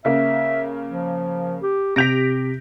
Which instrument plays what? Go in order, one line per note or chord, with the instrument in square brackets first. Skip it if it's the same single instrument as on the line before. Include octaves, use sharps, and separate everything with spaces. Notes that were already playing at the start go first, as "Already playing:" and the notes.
[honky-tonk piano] C#3 A#3 [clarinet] E5
[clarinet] F3
G4
[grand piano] C3 G6 B6 [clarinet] G4 [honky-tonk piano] A#6 D7 F7